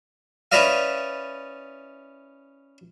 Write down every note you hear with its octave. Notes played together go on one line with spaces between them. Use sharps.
C#4 E4 B4 D5 D#5 F5